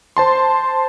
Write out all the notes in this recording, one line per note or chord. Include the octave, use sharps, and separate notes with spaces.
C5 A5 C6